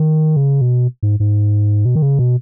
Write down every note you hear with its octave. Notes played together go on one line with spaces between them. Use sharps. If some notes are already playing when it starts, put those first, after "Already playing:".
Already playing: D#3
C#3
B2
G#2
G#2
B2
D#3
C#3
B2